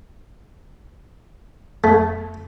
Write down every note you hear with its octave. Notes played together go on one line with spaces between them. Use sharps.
F2 A3